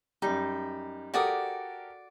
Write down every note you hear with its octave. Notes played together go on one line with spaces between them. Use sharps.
F#2 G3 D#4
F#4 G4 A4 A#4 D5 D#6